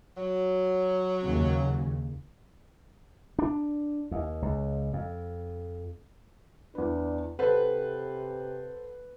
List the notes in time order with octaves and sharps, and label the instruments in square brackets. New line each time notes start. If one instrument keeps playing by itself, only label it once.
[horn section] F#3
[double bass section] D#2 C#3
[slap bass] D4
D#2
C#2
F2
[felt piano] E2 B4 [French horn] D4
[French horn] C3 [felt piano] A4 C5 F#5 [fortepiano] B4